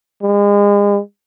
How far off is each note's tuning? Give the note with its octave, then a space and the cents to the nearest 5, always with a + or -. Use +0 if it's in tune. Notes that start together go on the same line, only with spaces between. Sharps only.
G#3 -35